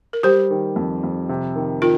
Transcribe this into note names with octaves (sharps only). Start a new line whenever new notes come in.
A#4
G3 G4 C5
D#3
F2
F2
C3
D#3
D#3 F4 A#4